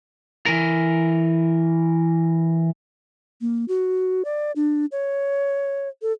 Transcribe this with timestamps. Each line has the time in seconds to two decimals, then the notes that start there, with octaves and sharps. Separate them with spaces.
0.46 E3 A#4
3.41 A#3
3.68 F#4
4.25 D5
4.56 D4
4.92 C#5
6.02 A4